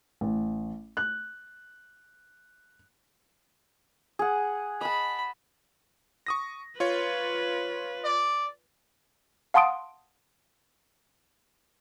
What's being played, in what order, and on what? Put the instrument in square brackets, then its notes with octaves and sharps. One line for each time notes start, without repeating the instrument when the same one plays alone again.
[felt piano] A1
F#6
[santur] G#4 F#5
[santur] D#5 A5 [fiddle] B5
[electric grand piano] C#6 D#6 A#6
[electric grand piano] F4 C#5 [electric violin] B4
[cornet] D5
[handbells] F5 F#5 A5 C6 D#6 D7